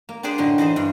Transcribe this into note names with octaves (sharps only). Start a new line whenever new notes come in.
A#3
D4 G4 G#4 C5 D5
F#2 A2 D3 D#4
E3 D#4 G#4 C5
G2